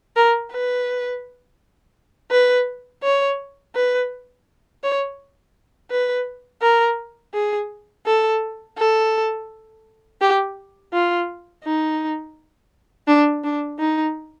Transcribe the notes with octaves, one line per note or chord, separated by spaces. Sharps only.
A#4
B4
B4
C#5
B4
C#5
B4
A#4
G#4
A4
A4
G4
F4
D#4
D4
D4
D#4